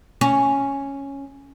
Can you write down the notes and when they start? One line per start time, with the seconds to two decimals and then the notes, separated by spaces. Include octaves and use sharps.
0.21 C#4